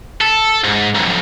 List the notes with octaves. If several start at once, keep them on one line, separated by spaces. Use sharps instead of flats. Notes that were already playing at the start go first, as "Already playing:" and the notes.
A4
G#2
B1 F2